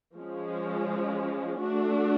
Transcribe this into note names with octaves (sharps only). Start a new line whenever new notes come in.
F3 G#3 C#4
A3 D4 F#4